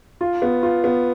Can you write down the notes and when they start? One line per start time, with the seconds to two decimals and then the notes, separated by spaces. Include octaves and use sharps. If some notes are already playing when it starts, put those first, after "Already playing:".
0.21 F4
0.42 B3
0.63 F4
0.84 B3